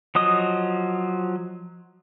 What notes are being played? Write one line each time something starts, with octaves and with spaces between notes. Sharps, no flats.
F3 F#3 D#5 D#6